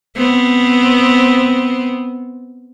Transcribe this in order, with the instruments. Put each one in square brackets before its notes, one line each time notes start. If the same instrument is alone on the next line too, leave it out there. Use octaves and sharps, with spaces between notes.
[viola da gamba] B3 C4